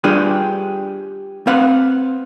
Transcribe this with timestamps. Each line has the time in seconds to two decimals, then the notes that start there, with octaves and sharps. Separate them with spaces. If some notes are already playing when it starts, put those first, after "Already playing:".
0.04 G3 D4 F4 G4 G#4 B4
1.47 C4 B4 F5 F#5